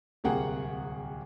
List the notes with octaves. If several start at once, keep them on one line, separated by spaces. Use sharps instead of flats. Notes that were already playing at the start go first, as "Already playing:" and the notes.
D1 C2 A#3 G#4 F#5 G5